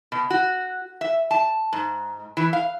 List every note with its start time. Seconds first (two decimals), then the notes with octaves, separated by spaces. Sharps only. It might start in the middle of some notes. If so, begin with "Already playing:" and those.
0.12 B2
0.30 F#4
1.01 E5
1.31 A5
1.73 G#2
2.37 E3
2.53 F5